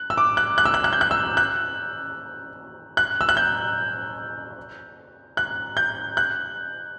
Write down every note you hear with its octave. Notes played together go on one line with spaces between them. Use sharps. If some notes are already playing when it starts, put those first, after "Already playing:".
Already playing: F#6
E6
D6
F#6
F#6
E6
F#6
F#6
G6
F#6
E6
F#6
F#6
E6
F#6
G6
F#6
G6
F#6